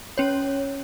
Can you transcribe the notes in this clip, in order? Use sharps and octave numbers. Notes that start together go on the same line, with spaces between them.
C#4 C#5